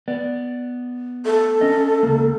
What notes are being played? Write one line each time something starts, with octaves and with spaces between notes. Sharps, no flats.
B3 D5
A4
C#4 D#5
C#2 A#3